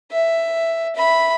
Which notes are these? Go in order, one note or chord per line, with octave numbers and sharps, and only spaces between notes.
E5
E5 B5